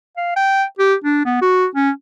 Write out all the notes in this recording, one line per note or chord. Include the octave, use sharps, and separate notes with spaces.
F5
G5
G4
D4
B3
F#4
C#4